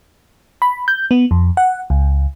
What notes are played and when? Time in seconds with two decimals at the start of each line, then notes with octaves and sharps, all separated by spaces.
0.62 B5
0.88 G6
1.11 B3
1.31 F2
1.57 F#5
1.90 C#2